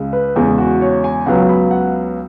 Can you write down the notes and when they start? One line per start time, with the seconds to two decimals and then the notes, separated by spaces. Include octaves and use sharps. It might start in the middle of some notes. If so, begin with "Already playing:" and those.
Already playing: C#2 C#3 G#3
0.13 B4
0.36 E2 C#3 G#3 G#4
0.48 G#4
0.58 F#4
0.81 C#5
1.04 G#5
1.26 C#2 C#3 F#3 B3 F#5
1.49 B5
1.71 F#5